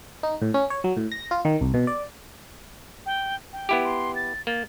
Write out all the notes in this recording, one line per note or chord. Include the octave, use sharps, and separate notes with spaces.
D#4
A2
C#4
C#5
F#3
A2
A#6
F4
D#3
C2
B2
D5
G5
G5
B3 E4 G4
C6
A6
A#3 A6